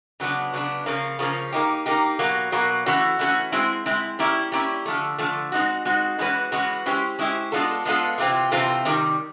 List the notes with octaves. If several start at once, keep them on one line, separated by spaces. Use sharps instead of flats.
C#3 F#3 B3 D4
C#3 F#3 B3 D4
C#3 F3 A#3 C#4
C#3 F3 A#3 C#4
A#3 D#4 G4
A#3 D#4 G4
B2 F#3 A#3
B2 F#3 A#3
E3 A3 C#4 F#4
E3 A3 C#4 F#4
G#3 C4 E4
G#3 C4 E4
G3 A#3 C#4 E4
G3 A#3 C#4 E4
D3 F3 A3
D3 F3 A3
G#3 C4 D#4 F#4
G#3 C4 D#4 F#4
E3 G#3 C#4 F#4 B4
E3 G#3 C#4 F#4 B4
G#3 C#4 E4 G4 C5
G#3 C#4 E4 G4 C5
G#3 B3 D4 F4 A4
G#3 B3 D4 F4 A4
C3 E3 A3 C4 F4
C3 E3 A3 C4 F4
C3 D#3 G3